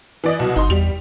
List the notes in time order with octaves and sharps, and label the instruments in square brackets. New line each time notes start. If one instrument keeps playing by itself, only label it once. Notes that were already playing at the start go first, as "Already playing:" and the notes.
[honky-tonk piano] E3 D5 D#5
C2 B2 F#3
[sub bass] G1 [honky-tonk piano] D#4 C6
[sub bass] E2 [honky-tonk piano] G3 F7